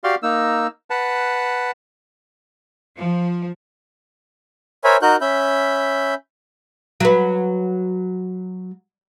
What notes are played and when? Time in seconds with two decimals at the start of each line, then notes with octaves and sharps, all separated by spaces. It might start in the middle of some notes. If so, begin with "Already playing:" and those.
0.04 F#4 G4 D5 F5 C6
0.23 A#3 D#4 E6
0.90 B4 F#5 A5
2.97 F3
4.84 A#4 C5 C#5 E5 G#5 B5
5.02 D#4 F#4 A#4 F#6 G6
5.21 C#4 E5 B5 G6
7.00 F#3 B4